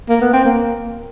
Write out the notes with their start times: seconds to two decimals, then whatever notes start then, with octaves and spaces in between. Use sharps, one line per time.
0.09 A#3
0.21 B3
0.33 C4
0.45 A#3